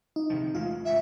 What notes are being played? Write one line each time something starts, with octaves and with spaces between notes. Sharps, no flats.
D#4
C3 D#3 F3
E2 G#3 A3 F4
G#1 G#2 C#3 E5